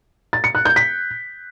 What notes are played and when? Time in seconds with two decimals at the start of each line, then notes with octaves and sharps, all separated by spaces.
0.33 A6
0.44 C#7
0.55 F#6
0.65 G6
0.76 B6